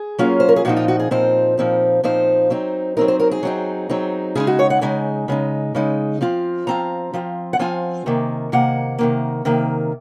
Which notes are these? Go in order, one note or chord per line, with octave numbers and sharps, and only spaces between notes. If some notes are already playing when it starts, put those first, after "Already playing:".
Already playing: G#4
F#3 A#3 C#4 F4
C5
A#4
G#4
A#2 F3 C4 D#4 F#4
F4
F#4
G#4
A#2 F3 C4 D#4 C5
A#2 F3 C4 D#4
A#2 F3 C4 D#4 C5
F#3 C4 D#4
F#3 C4 D#4 A#4
C5
A#4
G#4
F#3 C4 D#4
F#3 C4 D#4
C#3 G#3 D#4 G#4
F#4
C#5
F#5
C#3 G#3 D#4 G#5
C#3 G#3 D#4
C#3 G#3 D#4
F3 C4 F4
F3 C4 F4 A#5
F3 C4 F4
F#5
F3 C4 F4 G#5
C3 D#3 A#3
C3 D#3 A#3 F#5
C3 D#3 A#3
C3 D#3 A#3